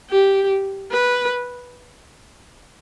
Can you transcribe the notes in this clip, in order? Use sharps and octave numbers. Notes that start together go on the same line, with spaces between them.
G4
B4